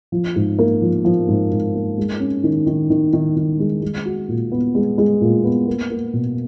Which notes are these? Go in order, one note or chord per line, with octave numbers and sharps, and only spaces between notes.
F3
G#2
A#3
F3
F3
G#2
G#2
A#3
G#3
C#4
D#3
D#3
D#3
D#3
D#3
G#3
G#3
F#4
A#2
B3
G#3
G#3
A#2
B3
A#3
A#3
B2